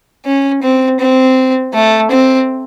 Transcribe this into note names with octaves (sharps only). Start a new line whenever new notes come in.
C#4
C4
C4
A3
C4